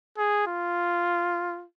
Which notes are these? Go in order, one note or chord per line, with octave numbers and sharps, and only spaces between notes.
G#4
F4